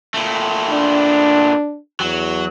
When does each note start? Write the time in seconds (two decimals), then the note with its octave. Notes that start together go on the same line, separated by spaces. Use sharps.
0.14 A#2 A3
0.70 D4
2.00 E2 F#3